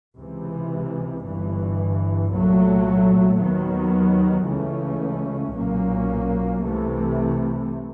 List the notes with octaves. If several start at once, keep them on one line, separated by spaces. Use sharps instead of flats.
C#2 C3 E3
G1 G2 E3
C2 A#2 F#3 A3
D#2 D#3 F#3 B3
C#2 C#3 E3 A3 C#4
B1 A#2 F#3 A#3 C#4
C2 C3 E3 A3